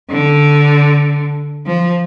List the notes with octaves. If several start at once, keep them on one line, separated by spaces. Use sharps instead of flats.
D3
F3